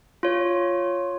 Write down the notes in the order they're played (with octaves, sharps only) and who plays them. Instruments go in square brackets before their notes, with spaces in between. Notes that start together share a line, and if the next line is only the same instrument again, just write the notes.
[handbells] F4 C#5